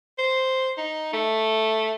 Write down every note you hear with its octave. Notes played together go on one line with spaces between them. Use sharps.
C5
D#4
A3